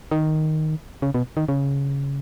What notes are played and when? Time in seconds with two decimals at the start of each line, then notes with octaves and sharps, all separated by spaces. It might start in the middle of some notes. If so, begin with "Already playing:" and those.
0.11 D#3
1.02 C#3
1.14 B2
1.37 D#3
1.48 C#3